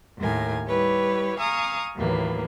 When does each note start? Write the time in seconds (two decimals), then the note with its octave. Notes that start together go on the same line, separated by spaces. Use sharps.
0.18 D#2 A2 A#4 G#5
0.68 G3 E4 G4 B4 C#5
1.38 F5 G#5 A#5 C#6 D#6
1.97 D#2 A2 E3 F#3 A#3 B4